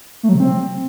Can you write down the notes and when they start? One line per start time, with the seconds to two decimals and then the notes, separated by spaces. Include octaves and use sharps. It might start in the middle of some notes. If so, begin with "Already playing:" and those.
0.23 A3
0.29 F#3
0.34 C3
0.40 C4